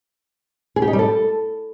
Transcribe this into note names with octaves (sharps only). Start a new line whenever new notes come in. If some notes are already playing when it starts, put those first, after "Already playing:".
G#4
G4
D#4
G3
A4